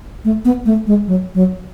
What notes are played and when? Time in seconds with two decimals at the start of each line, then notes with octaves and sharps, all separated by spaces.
0.25 A3
0.45 B3
0.65 A3
0.87 G#3
1.07 F#3
1.34 F#3